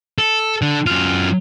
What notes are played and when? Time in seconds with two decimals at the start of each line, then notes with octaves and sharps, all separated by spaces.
0.18 A4
0.62 D3
0.86 F#2 F4